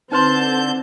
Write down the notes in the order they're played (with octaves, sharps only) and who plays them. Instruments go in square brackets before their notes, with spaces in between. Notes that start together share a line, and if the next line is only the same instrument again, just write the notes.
[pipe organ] D3 G6 [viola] C4 [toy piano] D#4 B4 C6 [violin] A5